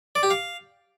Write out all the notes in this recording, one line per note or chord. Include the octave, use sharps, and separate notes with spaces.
D5
G4
F5